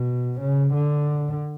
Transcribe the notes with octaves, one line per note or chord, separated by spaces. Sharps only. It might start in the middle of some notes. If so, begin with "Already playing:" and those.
Already playing: B2
C#3
D3